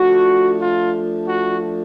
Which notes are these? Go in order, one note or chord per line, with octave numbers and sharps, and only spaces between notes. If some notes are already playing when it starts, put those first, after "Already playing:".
Already playing: F3 A3 D4 F#4
F4
F#4